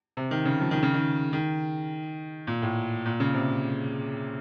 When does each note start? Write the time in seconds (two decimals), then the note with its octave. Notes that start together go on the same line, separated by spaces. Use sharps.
0.17 C3
0.31 D#3
0.45 C#3
0.60 F3
0.71 D#3
0.83 C#3
0.94 D#3
1.33 D#3
2.47 A#2
2.62 A2
3.06 A#2
3.20 C#3
3.34 C3